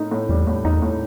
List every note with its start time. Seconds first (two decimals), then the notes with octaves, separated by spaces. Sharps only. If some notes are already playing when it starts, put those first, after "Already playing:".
Already playing: A2 D#4
0.11 A2
0.29 E2 G3
0.47 A2
0.65 E2 D#4
0.82 A2